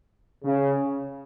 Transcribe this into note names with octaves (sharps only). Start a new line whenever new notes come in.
C#3